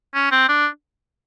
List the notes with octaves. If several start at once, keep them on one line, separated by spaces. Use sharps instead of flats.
C#4
C4
D4